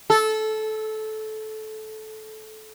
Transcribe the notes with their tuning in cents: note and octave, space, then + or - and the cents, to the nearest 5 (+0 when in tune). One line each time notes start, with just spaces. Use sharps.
A4 -20